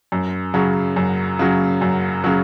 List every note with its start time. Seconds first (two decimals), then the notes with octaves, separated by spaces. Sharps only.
0.12 F#2
0.54 C#3 F#3
0.96 F#2
1.39 C#3 F#3
1.81 F#2
2.24 C#3 F#3